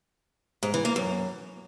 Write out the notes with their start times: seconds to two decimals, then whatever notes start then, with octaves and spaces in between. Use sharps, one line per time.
0.63 G#2
0.74 E3
0.85 A#3
0.96 F#2